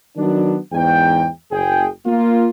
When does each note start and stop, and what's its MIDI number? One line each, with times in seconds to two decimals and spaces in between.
0.17 0.57 51
0.17 0.57 54
0.17 0.57 59
0.17 0.57 62
0.73 1.28 40
0.73 1.28 44
0.73 1.28 79
1.51 1.88 30
1.51 1.88 68
1.51 1.88 79
2.06 2.49 58
2.06 2.49 65